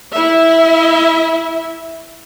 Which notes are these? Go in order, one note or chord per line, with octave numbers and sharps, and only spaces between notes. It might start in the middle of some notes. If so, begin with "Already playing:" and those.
E4 E5